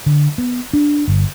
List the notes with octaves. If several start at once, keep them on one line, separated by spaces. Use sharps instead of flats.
D3
B3
D4
G1